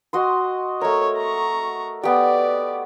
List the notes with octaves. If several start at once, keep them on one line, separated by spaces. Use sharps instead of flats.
F#4 D#5 C6
A3 A#4 C#5
A#5 C#6
B3 G4 D5